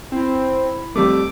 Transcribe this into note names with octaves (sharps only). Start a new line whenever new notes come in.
C4 E4
F2 G3 A3 D6